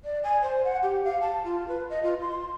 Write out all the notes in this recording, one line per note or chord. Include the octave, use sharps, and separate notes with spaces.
D5
G#5
C5
F#5
G4
F5
A5
F4
B4
D#5
F4
C6